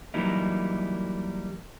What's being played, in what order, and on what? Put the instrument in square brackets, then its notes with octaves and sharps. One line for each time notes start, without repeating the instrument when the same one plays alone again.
[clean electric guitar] E3 F#3 G3 A#3 D#4 E4